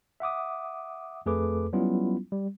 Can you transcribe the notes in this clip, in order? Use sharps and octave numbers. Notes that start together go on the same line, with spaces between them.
E5 F#5 D6 D#6
F2 A3 G#4 A4 B4 D6
F#3 G3 B3 C#4 E4 F4
G3